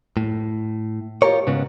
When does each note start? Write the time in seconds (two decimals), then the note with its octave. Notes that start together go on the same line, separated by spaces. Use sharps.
0.17 A2
1.22 F4 G4 A4 A#4 C#5
1.47 G#2 C#3 B3